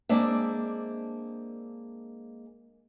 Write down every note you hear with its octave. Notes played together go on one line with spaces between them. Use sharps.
G#3 A#3 C4 D4 D5 E5